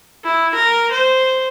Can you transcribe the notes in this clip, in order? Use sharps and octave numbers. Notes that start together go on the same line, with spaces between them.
E4
A#4
C5